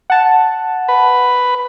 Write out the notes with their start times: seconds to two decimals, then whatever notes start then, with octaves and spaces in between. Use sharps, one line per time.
0.10 F#5 A5
0.88 B4